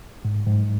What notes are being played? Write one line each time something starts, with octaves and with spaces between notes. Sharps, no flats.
G#2
G#2